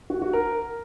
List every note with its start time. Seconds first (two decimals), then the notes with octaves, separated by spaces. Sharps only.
0.10 F#4
0.22 F#4
0.33 A#4